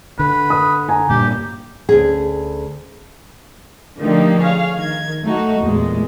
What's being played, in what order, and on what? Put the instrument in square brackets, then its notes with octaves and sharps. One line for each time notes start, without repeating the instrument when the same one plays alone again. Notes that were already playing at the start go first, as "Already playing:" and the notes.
[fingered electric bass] D3 [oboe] B4
[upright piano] D#6
G#5 A#5
[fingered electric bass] G2 A#2 [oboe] G4
[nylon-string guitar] D2 C#4 G#4
[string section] D3 F3 A3 A#3 D#4 G4
G#4 C#5 F5
D#3 G#6
F#3 A3 D#4 F#4
A1 E2 A#2 G#3